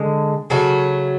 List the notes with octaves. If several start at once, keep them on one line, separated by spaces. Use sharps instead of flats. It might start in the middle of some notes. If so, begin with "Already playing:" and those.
Already playing: D3 G#3
C#3 F#3 A3 F#4